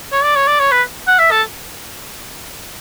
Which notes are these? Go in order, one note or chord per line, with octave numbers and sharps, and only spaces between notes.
C#5
D5
C#5
D5
C#5
B4
F#5
E5
A4